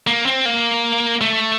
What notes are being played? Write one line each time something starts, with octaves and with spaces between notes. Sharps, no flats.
A#3
C4
A#3
A3